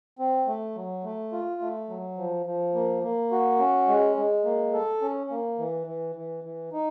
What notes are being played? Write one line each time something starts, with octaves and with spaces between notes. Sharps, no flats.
C4
A3
F#3
A3
F4
A3
F#3
F3
F3
A#3
A#3
F#4
C#4
G#3
G#3
A#3
A4
C#4
A#3
E3
E3
E3
E3
D#4